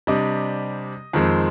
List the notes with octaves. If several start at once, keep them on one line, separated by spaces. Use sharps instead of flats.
C3 G3 D4 D#5
F2 D#3 G#3 C4